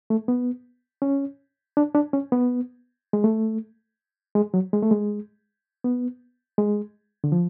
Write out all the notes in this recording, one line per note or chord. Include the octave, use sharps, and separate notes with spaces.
A3
B3
C#4
D4
D4
C#4
B3
G#3
A3
G#3
F#3
G#3
A3
G#3
B3
G#3
D3
F3